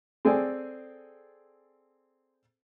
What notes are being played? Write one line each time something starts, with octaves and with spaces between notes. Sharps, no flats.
C4 G#4 A4 D5 G#5